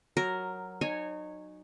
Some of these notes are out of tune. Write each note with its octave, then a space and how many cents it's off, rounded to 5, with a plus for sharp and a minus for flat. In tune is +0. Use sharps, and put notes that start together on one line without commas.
F#3 +0 A#4 +0
D#4 -30 C#5 -10 G#5 +0